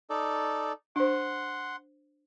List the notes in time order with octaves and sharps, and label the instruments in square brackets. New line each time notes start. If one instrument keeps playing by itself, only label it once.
[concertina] D#4 A4 D5
[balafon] D4 C5 [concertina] F#5 C6